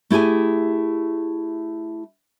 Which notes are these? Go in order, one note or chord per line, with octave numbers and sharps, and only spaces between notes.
A3 E4 G4 G#4 G#5